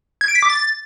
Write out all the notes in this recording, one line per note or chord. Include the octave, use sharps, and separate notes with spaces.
G#6
D7
B6
D6
A6